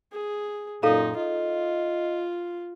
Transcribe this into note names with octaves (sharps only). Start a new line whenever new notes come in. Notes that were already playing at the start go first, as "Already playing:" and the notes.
G#4
F#2 A#2 D#4 A4 F5 A#5
F4 D#5